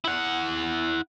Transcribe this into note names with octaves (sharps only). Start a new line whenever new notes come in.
E4 F#5